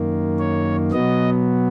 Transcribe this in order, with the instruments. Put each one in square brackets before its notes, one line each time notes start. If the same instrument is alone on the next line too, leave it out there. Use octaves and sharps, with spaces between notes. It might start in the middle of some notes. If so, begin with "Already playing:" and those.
Already playing: [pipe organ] F#2 D#3 A#3
C#5
B2 F#3 B3 D#5